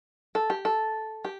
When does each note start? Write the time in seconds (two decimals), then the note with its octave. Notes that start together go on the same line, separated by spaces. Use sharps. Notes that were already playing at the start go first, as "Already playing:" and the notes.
0.35 A4
0.50 G4
0.65 A4
1.25 G4